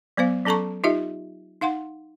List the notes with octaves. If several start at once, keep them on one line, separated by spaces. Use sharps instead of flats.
F#3 B3 C5 F5
F#3 C#4 A4 A5 A#5 C#6
D#4 F4 G4 D#5 E5
D#4 F5 F#5 C6